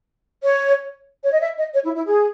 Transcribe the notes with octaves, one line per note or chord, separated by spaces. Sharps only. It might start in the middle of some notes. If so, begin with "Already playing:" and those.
C#5
C#5
D#5
E5
D#5
C#5
E4
E4
G#4